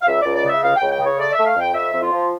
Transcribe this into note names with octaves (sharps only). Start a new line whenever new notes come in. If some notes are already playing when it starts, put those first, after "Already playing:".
F5
C#2 E5
D5
C#2
D5
C#3
E5
C#2 F5
G5
C#2
G5
C#3 C#5
A3 D5
E5
A3
F5
F2 G5
F2 E5
F2
F4
F3